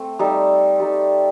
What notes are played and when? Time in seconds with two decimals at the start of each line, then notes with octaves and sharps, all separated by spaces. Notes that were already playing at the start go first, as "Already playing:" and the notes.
Already playing: A3 C4
0.19 G3 D#4 A4
0.80 G3 D#4 A4